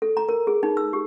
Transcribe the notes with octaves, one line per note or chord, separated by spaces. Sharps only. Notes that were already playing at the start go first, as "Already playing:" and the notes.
A4
A#5
A#4
G#4
D#4
E6
G4